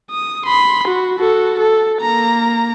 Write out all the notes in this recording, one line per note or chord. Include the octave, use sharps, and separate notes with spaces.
D#6
B5 C6
F#4
F#4 A4
A4
A#3 A#5